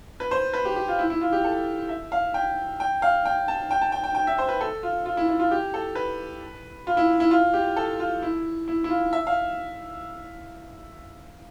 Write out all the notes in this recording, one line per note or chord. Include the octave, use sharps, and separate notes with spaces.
B4
C5
B4
G4
G4
F4
E4
E4
F4
G4
A4
E5
F5
G5
G5
F5
G5
A5
G5
A5
G5
G5
G5
E5
C5
B4
A4
F4
F4
E4
E4
F4
G4
A4
B4
F4
E4
E4
F4
G4
A4
F4
E4
E4
E4
F4
E5
F5